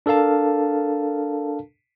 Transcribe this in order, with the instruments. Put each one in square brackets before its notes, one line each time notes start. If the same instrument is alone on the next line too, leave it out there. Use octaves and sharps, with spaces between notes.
[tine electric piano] D4 A4 A#4 F5 A5